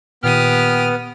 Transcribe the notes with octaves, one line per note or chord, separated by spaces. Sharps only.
A#2 D#3 B3 G4 D#6 F6